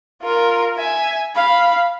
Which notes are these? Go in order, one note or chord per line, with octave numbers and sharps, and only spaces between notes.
F4 A#4
E5 G#5
F5 B5